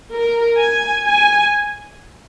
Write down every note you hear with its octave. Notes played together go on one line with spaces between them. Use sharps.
A#4
G#5
G#5